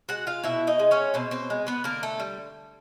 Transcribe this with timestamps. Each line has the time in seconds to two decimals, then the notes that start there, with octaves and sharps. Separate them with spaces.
0.09 G#3 F#4 F#5
0.27 F4 F5
0.44 B2 E4 E5
0.67 D#4 D#5
0.79 G#3
0.91 C#4 C#5
1.14 B2 C4 C5
1.31 C4 C5
1.50 G#3
1.67 B3 B4
1.84 D3 A#3 A#4
2.03 A3 A4
2.20 G3